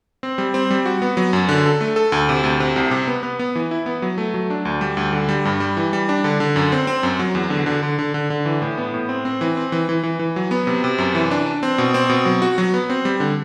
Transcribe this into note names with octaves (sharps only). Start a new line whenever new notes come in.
C4
G3
C4
G3
F#4
B3
F#3
F#2
D3
A4
A3
A4
D2
C3
D2
C3
C2
C3
B3
B3
B3
E3
E4
B3
F#3
A3
F#3
D4
D2
G3
D2
D3
G3
G2
G3
E3
G3
D4
D3
D3
F#2
C4
C4
F#2
F#3
E2
D3
D3
D3
D3
D3
D3
E3
A2
B3
A2
C4
C4
E3
C4
E3
E3
E3
E3
F#3
B3
C3
C3
F#2
E3
D4
D4
C4
B2
C4
B2
F#3
F#4
F#3
B3
C4
G3
D3